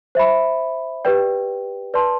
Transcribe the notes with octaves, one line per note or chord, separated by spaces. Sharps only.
C5 E5 B5
G4 B4 D5 G5
B4 D5 A5 C6